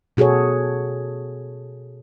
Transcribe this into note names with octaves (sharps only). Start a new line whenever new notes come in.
B2 F#4 G#4 A4 C#5